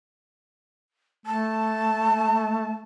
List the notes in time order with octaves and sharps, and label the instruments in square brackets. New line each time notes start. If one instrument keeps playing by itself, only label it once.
[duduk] A3 [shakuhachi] A5